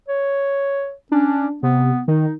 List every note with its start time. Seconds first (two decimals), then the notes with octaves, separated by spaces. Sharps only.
0.08 C#5
1.12 C#4 D4
1.63 C3 B3
2.08 D#3 D#4